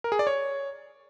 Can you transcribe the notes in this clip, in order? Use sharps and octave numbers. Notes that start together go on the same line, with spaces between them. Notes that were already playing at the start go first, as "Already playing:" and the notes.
A#4
G#4
D5
C#5